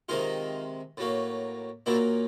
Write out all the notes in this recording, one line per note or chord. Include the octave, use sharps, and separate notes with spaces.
C3 D#3 G#3 D#4 F4
A2 F#3 A#3
A#2 F#3 A#3 D4 E4